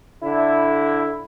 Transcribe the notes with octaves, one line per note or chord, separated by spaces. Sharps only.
D3 E4